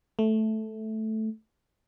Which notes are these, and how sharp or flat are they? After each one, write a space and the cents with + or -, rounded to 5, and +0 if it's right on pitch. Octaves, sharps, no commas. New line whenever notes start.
A3 -5